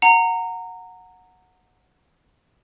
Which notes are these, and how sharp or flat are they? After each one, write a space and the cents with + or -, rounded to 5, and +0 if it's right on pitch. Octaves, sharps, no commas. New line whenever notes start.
F#5 -10 A#5 -20